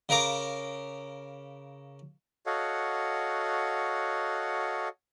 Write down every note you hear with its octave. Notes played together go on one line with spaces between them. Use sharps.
C#3 A#4 F5 A#5 D6
F#4 A4 C#5 D#5 F5 F#5